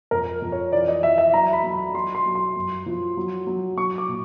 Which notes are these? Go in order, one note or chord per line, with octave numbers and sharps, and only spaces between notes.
F2 A#4
F2
C#5
E3 D5
D#5
E3 E5
E5
F#3 A#5
B5
F#3
B5
F#3 C6
C6
F#3
C6
F#2
F3
F#3
F#3
F#3 C#6
D6
A#2